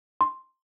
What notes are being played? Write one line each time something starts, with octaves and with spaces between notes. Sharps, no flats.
C6